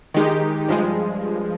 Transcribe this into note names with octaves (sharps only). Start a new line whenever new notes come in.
D#3 G#3 D#4 G4
G2 F3 G#3